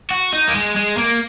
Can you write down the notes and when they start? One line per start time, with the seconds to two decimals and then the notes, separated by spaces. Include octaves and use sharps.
0.11 F#4
0.33 D#4
0.48 A#3
0.55 G#3
0.76 G#3
0.98 A#3